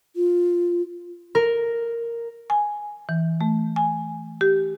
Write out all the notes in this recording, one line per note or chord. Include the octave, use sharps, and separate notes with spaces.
F4
A#4
G#5
E3
A3
G#5
G4